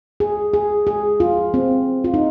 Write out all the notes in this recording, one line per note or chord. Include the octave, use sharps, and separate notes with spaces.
G#4
G#4
G#4
F4
C4
F4
D#4